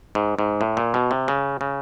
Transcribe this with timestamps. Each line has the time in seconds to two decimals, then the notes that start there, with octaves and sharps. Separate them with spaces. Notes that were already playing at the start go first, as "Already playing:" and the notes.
0.15 G#2
0.39 G#2
0.61 A2
0.77 A#2
0.94 B2
1.11 C3
1.28 C#3
1.61 C#3